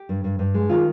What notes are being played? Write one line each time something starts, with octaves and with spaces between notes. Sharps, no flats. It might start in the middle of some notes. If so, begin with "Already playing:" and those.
Already playing: G4
G2
G2
G2
G#3
D#3 F4